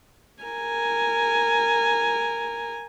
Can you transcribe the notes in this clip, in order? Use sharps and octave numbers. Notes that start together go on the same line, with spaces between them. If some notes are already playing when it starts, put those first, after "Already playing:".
A#4 G#5